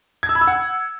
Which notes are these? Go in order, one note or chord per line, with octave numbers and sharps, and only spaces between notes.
G#6
E6
B5
E6
F#5